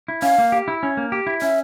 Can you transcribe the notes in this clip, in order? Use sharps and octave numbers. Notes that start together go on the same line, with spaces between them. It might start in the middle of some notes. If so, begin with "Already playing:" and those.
E4
C#4 F5
A#3
G4
E4
C#4
A#3
G4
E4
C#4 E5